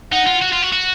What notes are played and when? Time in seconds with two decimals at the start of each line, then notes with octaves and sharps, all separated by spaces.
0.12 D#4 F#5
0.27 F4
0.42 F#4
0.53 F4
0.62 F#4
0.73 F#4